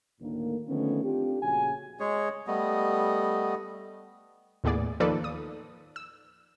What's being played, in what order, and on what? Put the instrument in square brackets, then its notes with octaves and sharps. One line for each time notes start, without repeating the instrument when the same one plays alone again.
[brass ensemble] D2 A2 D3 D#3 A#3
D3 D#3 F3 A3 B3 C#4
C4 D4 F4 G4
A#1 C#3 F#4 G#5
[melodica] G#3 G#4 C#5
G3 A3 B3 D#5
[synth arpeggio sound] D#2 A2 B3 G#4 D5
D#3 F3 A#3 A4 B4 D5
D#6
E6